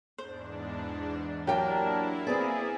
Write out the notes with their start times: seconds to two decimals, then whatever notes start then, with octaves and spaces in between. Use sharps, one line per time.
0.18 E2 G#2 D4 C5
1.47 F#3 A#3 D4 E4 G4 A#4 G5
2.27 C4 G#4 B4 D5